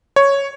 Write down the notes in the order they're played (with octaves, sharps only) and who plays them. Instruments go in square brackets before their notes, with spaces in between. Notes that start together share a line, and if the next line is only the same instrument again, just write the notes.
[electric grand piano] C#5